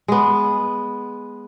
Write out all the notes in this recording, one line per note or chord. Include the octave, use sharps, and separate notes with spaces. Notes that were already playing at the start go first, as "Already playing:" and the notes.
G#3 B3